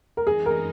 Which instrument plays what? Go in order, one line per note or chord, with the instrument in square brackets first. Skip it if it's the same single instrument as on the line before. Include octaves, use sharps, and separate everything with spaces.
[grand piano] A#4
[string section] F#2 E3 G#3 D#4 [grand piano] G#4
[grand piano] A#4